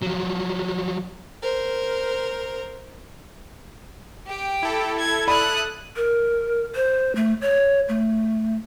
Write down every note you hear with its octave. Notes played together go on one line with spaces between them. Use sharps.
F3 F#3
A#4 C5
G4 G5
E4 A4
G#6
D5 B5 D#6 F#6
A#4
C5
A3
C#5
A3